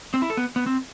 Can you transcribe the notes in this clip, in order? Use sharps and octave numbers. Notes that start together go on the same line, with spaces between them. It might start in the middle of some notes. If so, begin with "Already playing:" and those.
C4
E4
A4
B3
B3
C4